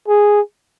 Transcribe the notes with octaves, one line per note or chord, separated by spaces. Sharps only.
G#4